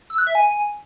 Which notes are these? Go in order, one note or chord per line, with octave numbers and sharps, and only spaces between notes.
E6
F#6
E5
G#5